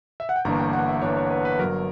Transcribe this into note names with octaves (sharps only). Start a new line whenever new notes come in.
E5
F#5
G5
G1 G2 E3 A#3 D4 A#5
G5
F#5
E5
G1 G2 E3 A#3 D4 C#5
C#5
B4
B4
G1 G2 F#3 A#4